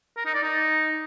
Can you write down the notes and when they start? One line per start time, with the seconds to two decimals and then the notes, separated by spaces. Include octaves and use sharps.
0.17 A#4
0.25 D#4
0.34 D5
0.43 D#4